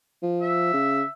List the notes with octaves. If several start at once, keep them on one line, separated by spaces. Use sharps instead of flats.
F3
E5
C#3